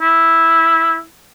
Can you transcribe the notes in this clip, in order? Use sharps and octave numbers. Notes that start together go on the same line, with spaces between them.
E4